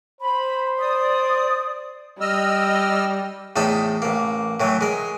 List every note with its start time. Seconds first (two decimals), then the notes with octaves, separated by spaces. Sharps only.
0.21 C5 B5
0.78 D5 D#6
2.21 G3 D#5 E6 F6
3.56 E2 A2 D#4 A4 B5
4.02 A1 A#3
4.60 A2 E3 F#3
4.81 G#3 A#4